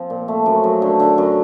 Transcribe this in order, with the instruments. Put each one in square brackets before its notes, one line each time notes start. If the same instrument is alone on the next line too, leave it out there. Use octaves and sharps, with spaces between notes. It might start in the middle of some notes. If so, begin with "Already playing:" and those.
Already playing: [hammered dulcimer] F3 C4
A#2
A3
F#2
F#2
D3
D3
F#2